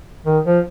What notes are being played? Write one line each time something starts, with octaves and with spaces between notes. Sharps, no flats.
D#3
F3